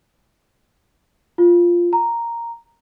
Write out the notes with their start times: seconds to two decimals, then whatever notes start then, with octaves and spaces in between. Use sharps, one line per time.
1.38 F4
1.93 A#5